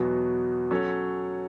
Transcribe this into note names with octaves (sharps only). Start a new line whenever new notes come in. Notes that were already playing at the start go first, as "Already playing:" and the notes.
Already playing: E2 B2 F#3 B3 F#4
F#3 C#4 A4 C#5